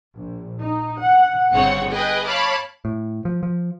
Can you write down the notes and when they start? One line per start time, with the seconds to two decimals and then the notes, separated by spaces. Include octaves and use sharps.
0.15 A#1
0.61 D#4
1.02 F#5
1.54 G1 C#3 C4 C#5 F#5 C#7
1.91 G#4 B4 D#5 G5 G#5
2.25 C#5 F5 A5 B5 D6
2.85 A2
3.25 F3
3.43 F3